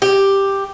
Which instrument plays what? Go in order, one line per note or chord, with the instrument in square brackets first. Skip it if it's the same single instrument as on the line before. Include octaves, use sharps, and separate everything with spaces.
[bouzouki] G4